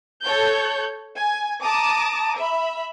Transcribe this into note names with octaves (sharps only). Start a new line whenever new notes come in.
A4 C#5 G6
G#5
A5 A#5 D6 D#6
E5 B5